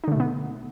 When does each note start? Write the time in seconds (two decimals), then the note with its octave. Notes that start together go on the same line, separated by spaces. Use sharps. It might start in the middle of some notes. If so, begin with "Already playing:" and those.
0.04 D#4
0.08 D3
0.12 A3
0.16 B2
0.20 B3